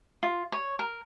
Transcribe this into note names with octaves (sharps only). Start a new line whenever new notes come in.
F4
C#5
A#4